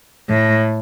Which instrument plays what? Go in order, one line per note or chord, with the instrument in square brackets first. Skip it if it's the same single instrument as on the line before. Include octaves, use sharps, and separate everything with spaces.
[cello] A2